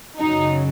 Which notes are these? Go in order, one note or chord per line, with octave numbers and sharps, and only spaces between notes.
F#2 C#3 F#3 D#4